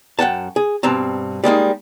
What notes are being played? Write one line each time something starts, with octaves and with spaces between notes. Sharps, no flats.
F#2 F#5 G5 A5
G#4
G2 B2 C4 A5 A#5
G3 G#3 A#3 D#4